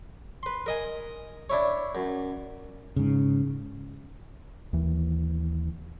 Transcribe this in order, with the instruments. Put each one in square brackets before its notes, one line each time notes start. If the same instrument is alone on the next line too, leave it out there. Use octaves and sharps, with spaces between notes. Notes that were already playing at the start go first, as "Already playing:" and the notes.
[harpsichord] B4 C6
A#4 D#5 G#5
D4 E4 C#5
F#2
[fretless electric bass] G#2 C#3
[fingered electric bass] D#2 E3